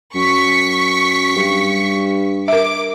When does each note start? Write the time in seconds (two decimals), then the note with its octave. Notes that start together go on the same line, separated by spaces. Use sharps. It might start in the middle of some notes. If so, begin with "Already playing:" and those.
0.15 F#2 C#6 B6
1.36 G2
2.48 A#4 E5 D6